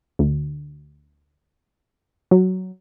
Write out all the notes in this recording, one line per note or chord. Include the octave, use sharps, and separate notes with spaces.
D2
F#3